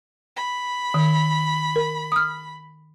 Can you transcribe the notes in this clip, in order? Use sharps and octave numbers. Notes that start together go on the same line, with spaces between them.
B5
D#3
A#4
D#6 F6